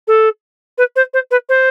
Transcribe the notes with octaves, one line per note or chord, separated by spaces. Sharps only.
A4
B4
C5
C5
B4
C5